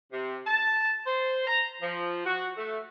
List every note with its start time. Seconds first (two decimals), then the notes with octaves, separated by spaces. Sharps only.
0.13 C3
0.46 A5
1.07 C5
1.47 A#5
1.82 F3
2.26 F#4
2.58 A3